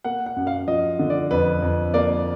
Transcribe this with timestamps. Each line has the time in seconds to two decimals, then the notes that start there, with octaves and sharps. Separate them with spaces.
0.04 A#3 F#5
0.26 F#5
0.36 F#2
0.47 F5
0.68 F3 D#5
0.99 D3
1.10 D5
1.31 F2 B4
1.62 F2
1.94 A#3 D5